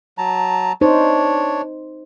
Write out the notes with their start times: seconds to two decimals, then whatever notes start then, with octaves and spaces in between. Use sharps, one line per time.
0.18 F#3 A5 A#5
0.81 D4 D#4 C5 C#5